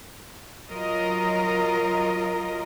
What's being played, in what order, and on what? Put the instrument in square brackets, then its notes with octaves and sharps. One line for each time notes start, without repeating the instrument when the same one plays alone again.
[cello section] F#3 F4 A#4 D#5